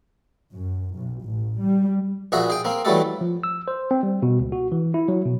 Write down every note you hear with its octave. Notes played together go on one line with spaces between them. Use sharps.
F#2
B1
A1
G3
A#1 A#2 F#4 G#4 E5
G#4 G5
A#3 C4
E3 F#3 G3 A3 A4
F3
E6
C5
C4
G3
B2
C#2
F#4
E3
E4
F#3
B2